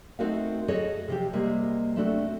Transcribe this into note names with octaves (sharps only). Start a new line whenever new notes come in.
A3 C4 D#4 F#4 A#4 F5
F#4 G#4 A4 C#5 D#5
C3 F3 G4
C3 G3 G#3 A#3
A3 C4 D4 F#4 A4